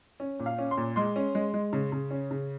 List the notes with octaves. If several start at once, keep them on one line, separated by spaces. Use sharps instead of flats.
C#4
A#2
F5
C#4
C6
A#2
G#3 C6
C#4
G#3
G#3
C#3
C#3
C#4
C#3